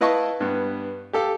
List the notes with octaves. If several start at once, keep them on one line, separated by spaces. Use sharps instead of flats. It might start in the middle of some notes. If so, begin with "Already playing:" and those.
E4 B4 D#5 F5 A5 C#6
G2 B3
G4 A4 F5